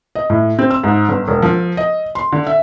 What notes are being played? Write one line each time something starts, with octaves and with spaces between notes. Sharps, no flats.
D#5
A2
C4
E6
G#2
G1
E1
F3
D#5
C6
D3
E5